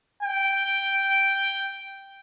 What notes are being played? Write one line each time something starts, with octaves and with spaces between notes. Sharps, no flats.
G5